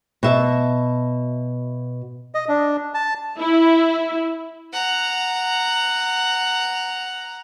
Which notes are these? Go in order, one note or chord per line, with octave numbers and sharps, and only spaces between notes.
B2 E5 A5
D#5
D4
A5
E4
F#5 A#5